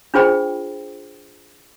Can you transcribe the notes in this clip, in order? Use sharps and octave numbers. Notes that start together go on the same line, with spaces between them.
D4 F4 G#4 C5 G5 B5